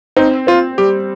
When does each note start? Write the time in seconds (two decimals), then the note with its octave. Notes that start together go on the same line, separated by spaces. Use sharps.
0.17 C4 D#4
0.47 C4 F4
0.78 G3 G4